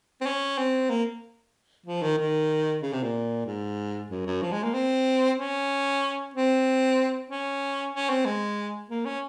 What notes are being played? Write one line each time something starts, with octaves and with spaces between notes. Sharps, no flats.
C4
C#4
C4
A#3
F3
D#3
D#3
C#3
C3
A#2
G#2
F#2
F#2
F3
G#3
A#3
C4
C#4
C4
C#4
C#4
C4
G#3
A#3
C#4